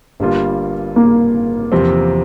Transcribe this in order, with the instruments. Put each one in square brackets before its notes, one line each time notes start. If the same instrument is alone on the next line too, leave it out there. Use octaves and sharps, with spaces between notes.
[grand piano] G1 G2 G3 A#3 F4
[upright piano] A#3
[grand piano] E2 C3 F3 C4